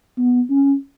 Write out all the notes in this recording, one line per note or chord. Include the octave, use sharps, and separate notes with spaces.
B3
C#4